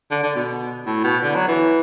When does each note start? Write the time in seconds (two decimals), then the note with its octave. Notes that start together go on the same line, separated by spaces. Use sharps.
0.11 D3
0.23 D3
0.35 B2
0.86 A2
1.04 B2
1.23 D3
1.35 F#3
1.48 E3